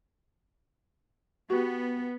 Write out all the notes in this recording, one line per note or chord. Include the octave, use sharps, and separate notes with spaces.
B3 F#4 G4